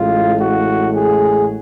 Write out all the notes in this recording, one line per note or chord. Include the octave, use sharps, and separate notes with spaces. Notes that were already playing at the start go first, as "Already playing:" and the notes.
Already playing: A1 A2 G#3 F4
F#4
G#4